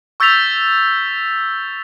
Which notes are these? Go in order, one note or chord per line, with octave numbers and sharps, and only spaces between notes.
C#6 E6 G6 A6 B6 F7